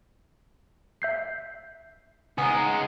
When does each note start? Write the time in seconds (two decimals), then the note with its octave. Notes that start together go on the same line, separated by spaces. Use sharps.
1.02 E5 G6 C7
2.38 C#2 G#3 B3 D#4 F#5 G#5